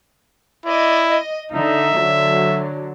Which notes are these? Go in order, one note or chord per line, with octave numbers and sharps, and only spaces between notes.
E4 D5 D#5
D#5
D3 D#4 E5
D3 F#3